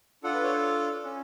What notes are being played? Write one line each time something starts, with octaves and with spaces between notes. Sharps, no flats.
D4 F4 A4 F#5
B4
C#5
C#4